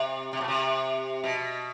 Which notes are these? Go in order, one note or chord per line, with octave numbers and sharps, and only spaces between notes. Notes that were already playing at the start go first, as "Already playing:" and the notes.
Already playing: C3
C3
B2
C3
B2